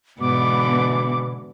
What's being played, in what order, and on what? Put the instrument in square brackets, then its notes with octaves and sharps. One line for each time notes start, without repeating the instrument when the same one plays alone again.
[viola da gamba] G#2 D3 [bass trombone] B2 [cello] E3 B3 [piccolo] D6